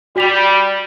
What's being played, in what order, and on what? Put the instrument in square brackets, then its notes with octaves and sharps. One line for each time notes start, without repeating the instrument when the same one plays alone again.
[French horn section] G3 [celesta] F#4 B6 F7